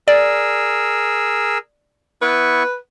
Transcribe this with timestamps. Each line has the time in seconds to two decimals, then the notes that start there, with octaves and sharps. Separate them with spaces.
0.08 G#4 A#4 D5 E6
2.22 B3 E4 B4 C#6